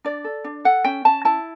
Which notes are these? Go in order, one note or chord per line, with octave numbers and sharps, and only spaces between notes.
D4 D5
A4
D4
A4 F#5
C#4 G5
C#4 A5
E4 A5